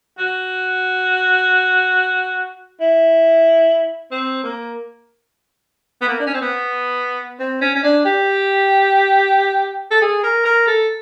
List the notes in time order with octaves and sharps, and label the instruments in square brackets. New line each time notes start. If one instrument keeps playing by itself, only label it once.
[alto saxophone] F#4
E4
C4
A#3
B3
A#3
D4
C#4
C4
B3
C4
C#4
C#4
D4
G4
A4
G#4
A#4
A#4
A4